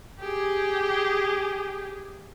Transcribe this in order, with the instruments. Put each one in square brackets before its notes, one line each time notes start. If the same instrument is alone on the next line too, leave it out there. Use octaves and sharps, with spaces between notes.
[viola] G4 G#4